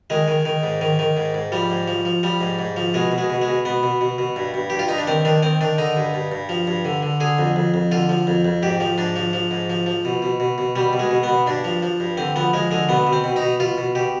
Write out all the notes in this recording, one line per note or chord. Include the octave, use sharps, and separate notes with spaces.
D#3 G#3
D#3
D#3
G#2
D#3
D#3
G#2
G#2
F3 G3
G#2
F3
F3
F3 G3
G#2
G#2
F3
B2 G#3
B2
G#3
B2
G#3
B2
B2 B3
B2
B2
B2
G2
G2
G2 G4
F4
G2 D#4
D4
D#3 C4
D#3 D4
D#3 C4
D#3 D4
D3 D#4
G2
G2
G2
F3
G2
D3
D3
D3 G#4
F2
F2
F2
D3 F4
F3
F2
F2
G#2 G4
F3
G#2 D4
F3
F3
G#2
F3
F3
B2
B2
B2
B2
B2 G3
B2
G#3
B2
B3
B2
G2 D4
F3
F3
G2
D3 C4
F3 B3
F3 G#3
D3 G#3
B2 B3
B2
C4
B2
D#4
B2
B2 F4
B2
B2 G4